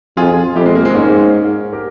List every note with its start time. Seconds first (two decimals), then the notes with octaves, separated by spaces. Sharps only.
0.17 F2 F4 G#4
0.55 F2 E4 G4
0.66 G#3
0.75 A#3
0.85 G#3 C4
0.94 G#2 A#3 C#4
1.73 G4 A#4